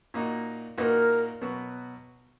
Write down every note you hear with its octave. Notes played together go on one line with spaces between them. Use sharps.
A#2 A#3 D#4 F#4
A#2 A#3 D#4 F#4 A#4 B4
B2 F#3 B3 F#4